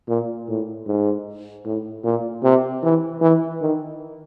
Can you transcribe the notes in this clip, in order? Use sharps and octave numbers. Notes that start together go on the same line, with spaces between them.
A#2
A2
G#2
A2
A#2
C3
E3
E3
D#3